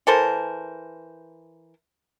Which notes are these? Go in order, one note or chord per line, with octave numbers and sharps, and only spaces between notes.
E3 A4 A#4 C5